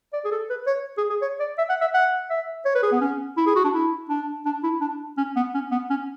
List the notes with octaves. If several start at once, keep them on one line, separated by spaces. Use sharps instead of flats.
D5
G#4
A4
B4
C#5
G#4
G#4
C#5
D5
E5
F#5
E5
F#5
E5
C#5
B4
G#4
B3
C#4
E4
G#4
F#4
D4
E4
D4
D4
E4
D4
C#4
B3
C#4
B3
C#4